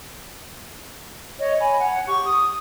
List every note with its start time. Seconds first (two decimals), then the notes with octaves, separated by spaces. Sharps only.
1.40 C#5 D#5
1.60 G#5 B5
1.80 C#5 F#5
2.07 G4 C#6
2.25 D#6